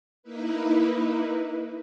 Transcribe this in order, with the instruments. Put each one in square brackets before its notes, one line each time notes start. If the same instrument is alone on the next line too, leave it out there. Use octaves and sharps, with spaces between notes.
[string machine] A#3 D#4 E4 B4